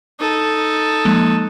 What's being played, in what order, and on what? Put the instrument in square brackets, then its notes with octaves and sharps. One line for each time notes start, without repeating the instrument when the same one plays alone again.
[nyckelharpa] D#4 A4
[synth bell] F3 G#3 A#3